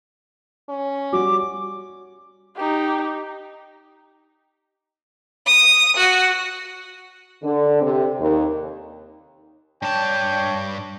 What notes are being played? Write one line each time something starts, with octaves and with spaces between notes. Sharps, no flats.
C#4
G3 F#4 D6
D#4 G4
D#6
F#4
D3
C3
D#2
G2 D4 C#5 G5 A5